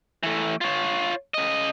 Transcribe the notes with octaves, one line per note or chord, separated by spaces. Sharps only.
E3 A3
F4 C#5
C#3 D#5